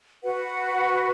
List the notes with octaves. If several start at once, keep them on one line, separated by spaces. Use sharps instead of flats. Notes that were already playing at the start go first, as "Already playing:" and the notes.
F#4 B4 F#5